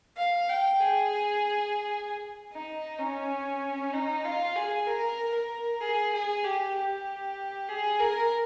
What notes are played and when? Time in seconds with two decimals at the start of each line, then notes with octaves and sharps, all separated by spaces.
0.17 F5
0.49 G5
0.80 G#4
2.52 D#4
2.99 C#4
3.94 D#4
4.25 F4
4.56 G#4
4.86 A#4
5.34 A#4
5.81 G#4
6.12 G#4
6.44 G4
6.75 G4
7.69 G#4
7.99 A#4